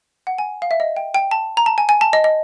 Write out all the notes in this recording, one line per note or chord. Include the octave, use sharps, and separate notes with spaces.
F#5
G#5
F5
E5
D#5
G5
G5
A5
A#5
A5
G#5
G#5
A5
D#5
D#5